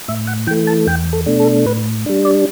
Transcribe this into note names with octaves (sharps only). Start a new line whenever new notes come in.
A2 E5
F#5
E3 A3 G5
A5
E2 G5
A4
B2 A3 D4
A4
A2 B4
G3 D4
D5